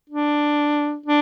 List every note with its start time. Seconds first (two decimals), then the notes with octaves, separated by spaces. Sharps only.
0.10 D4
1.06 D4